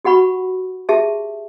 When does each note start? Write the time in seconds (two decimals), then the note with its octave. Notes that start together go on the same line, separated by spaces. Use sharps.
0.05 F#4 G4 F#5 B5 C#6
0.89 G4 G#4 E5 A5